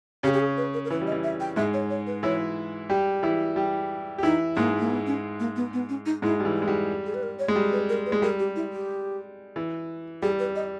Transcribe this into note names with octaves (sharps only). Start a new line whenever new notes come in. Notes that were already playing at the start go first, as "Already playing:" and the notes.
C#3 C#4 G4
G4
G#4
B4
A#4
A#4
E3 B4
G3
D#5
E3
E5
G5
G#2 G#3 E5
C#5
C#5
B4
E3 E4 C#5
G3 G4
E3 E4
G3 G4
G4
E3 D#4 E4
G#2 G#3 A#3
A#3
B3
C#4
A#3
B3
B3
C#4
D#4
G#2 G#3 E4
G3
E3
E4
G#3
G3
G#4
B4
A#4
C#5
G#3
G3
B4
A#4
B4
G#3
G3 A#4
G4
E4
G4
E3
G3 G#4
B4
D#5